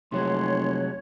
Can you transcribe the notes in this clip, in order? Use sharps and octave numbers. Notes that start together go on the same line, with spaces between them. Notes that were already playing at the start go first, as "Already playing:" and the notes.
F1 C3 F#3 G#3 C#5 C6